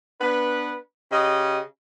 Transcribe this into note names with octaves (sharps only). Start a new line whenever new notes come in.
B3 D4 B4
C#3 G4 D#5